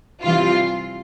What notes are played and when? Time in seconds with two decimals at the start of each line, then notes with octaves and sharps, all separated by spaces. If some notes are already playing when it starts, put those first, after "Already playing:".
0.24 C3 E3 G3 F4